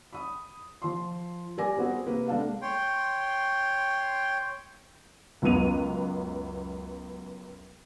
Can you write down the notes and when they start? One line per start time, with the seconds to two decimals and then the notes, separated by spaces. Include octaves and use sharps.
0.13 B5 D#6
0.82 F3 C6
1.57 G3 G4 A#4 D5 G#5 A#6
1.77 B3 C4 F#4 G#4 C5
2.06 C3 A#3 A#4 B4
2.28 G#3 B3 D4 A4 F5
2.62 C#5 G5 C6
5.42 C#2 F#2 B3 D#7 F7